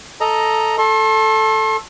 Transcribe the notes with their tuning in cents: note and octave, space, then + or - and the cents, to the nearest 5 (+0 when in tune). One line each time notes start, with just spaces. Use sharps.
A4 +0 D#5 +0 A#5 +5
A4 +0 C6 +45